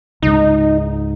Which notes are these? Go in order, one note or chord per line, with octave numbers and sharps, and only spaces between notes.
C#2 G#2 D#4